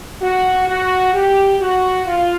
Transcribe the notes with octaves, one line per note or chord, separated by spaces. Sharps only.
F#4
F#4
G4
F#4
F4